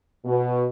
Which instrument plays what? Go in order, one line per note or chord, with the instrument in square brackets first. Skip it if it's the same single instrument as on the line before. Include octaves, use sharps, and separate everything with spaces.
[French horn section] B2